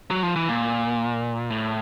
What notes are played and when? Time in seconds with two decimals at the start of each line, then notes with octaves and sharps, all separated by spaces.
0.11 F#3
0.23 F3
0.36 E3
0.48 A#2
1.50 A2